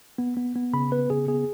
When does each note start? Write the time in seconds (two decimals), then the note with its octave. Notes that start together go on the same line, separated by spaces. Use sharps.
0.18 B3
0.37 B3
0.55 B3
0.73 C#3 B5
0.92 B3 B4
1.10 C#3 G#4
1.28 B3 G#4